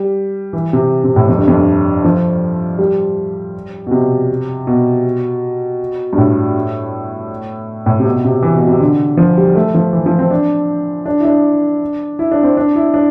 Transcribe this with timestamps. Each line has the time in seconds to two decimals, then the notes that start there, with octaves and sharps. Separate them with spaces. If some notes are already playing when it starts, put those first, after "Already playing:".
Already playing: G3
0.53 E3
0.73 C3
1.04 C3
1.16 A2
1.28 F2
1.38 G2
1.48 F2
1.57 G2
2.05 F3
2.78 G3
3.87 B2
3.91 C3
4.67 B2
6.13 G2
6.18 A2
7.86 A2
8.00 C3
8.06 B2
8.25 C3
8.43 E3
8.56 B2
8.68 C3
8.80 D3
9.17 F3
9.37 G3
9.55 A3
9.74 F3
9.93 E3
10.06 F3
10.19 C4
10.31 D4
11.06 D4
11.20 E4
11.25 D4
12.19 E4
12.31 D4
12.43 C4
12.57 D4
12.76 E4
12.94 D4